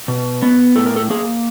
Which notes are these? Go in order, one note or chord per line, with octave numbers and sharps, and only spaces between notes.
B2
B3
A2 A4
A#4
A4
A#3 G#4